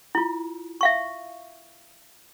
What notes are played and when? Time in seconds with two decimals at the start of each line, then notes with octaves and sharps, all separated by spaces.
0.15 E4 F4
0.81 E5 F5 C#6